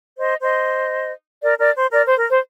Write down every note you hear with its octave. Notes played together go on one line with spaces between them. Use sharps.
C5 D#5
C5 D#5
A#4 D5
A#4 D5
C5
A#4 D5
C5
A#4
C5